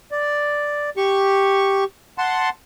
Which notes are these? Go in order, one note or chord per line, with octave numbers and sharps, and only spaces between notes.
D5
G4 C#6
F#5 A5 C6